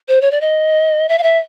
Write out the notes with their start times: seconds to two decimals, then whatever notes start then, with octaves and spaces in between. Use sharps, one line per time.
0.08 C5
0.21 C#5
0.31 D5
0.41 D#5
1.09 E5
1.18 F5
1.23 E5